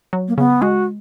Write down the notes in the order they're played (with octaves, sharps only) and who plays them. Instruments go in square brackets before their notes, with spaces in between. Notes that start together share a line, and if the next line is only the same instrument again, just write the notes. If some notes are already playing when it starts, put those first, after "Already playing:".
[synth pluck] F#3
[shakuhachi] A#3
[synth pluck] C#3 [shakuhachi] B3
[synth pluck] G#3 [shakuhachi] F#4